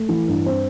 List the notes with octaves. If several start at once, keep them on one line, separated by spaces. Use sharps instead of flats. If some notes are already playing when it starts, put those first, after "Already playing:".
Already playing: A3
E3
G2
C4